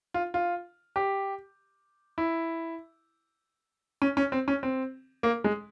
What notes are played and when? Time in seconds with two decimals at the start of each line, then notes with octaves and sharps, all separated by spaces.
0.14 F4
0.34 F4
0.96 G4
2.18 E4
4.02 C#4
4.17 C#4
4.32 C4
4.48 C#4
4.63 C4
5.23 A#3
5.44 G#3